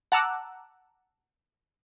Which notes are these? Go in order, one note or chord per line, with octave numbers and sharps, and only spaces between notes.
F#5 A5 A#5 D6 E6 F#6